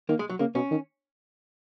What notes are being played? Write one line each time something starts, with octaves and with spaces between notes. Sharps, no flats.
D#3 A#3
G#3
F#3
C#3 A#3
B2 C#4
D#3